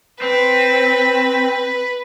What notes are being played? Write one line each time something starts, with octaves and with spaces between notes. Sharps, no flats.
C4 B4